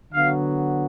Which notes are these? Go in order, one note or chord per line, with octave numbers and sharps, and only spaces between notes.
D3 F#3 B3 F5